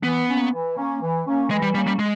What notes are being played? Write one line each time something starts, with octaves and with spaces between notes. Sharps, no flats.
E3 B3
A#3 C#4
E3
A#3 C#4
E3
A#3 C#4
E3 G#3
G3
G3 A#3 C#4
G3
G#3